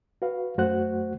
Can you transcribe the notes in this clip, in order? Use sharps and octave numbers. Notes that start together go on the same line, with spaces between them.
F#4 B4 F5
F#2 A3 F#4 C5 F#5 F#6